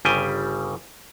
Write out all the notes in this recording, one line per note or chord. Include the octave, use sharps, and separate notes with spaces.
G1 C#3 G3 G5 G#5